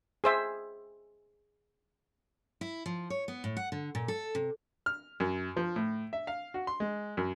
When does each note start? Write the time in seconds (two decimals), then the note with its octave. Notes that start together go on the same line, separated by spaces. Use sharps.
0.24 G#4 C5 E5
2.61 E4
2.86 F3
3.10 C#5
3.28 B3
3.44 A2
3.57 F#5
3.72 D3
3.95 A#2
4.08 A4
4.35 C3
4.86 F6
5.20 F#2
5.57 F3
5.76 A2
6.13 E5
6.27 F5
6.54 F#4
6.67 C6
6.80 G#3
7.17 F#2